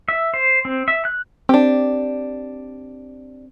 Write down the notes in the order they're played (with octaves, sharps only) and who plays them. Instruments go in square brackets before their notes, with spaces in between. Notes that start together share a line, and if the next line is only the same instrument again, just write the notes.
[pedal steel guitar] E5
C5
C4
E5
F#6
[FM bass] C4 [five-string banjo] D4 G4